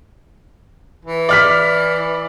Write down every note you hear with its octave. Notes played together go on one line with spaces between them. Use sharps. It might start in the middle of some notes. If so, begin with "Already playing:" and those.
E3
D5 F6 B6